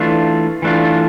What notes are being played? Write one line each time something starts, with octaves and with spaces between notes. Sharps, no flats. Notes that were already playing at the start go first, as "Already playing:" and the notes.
Already playing: E3 A3 D4 F4
E3 A3 D4 F4